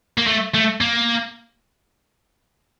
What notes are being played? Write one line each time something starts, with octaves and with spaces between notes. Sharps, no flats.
A#3
A3
A3
A#3